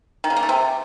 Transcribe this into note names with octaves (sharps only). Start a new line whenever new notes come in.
D#3
C#3
A#3
A3
C3